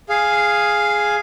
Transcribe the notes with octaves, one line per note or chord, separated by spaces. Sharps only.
G#4 F5